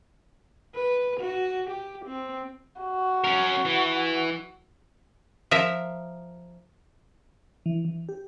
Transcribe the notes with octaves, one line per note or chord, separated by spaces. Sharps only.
B4
F#4
G4
C4
F#4
C#4 A#4
E3
F3 A#4 E5
E3
E3
G4